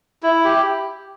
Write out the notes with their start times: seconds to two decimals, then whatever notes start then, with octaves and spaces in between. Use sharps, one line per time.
0.23 E4
0.44 G4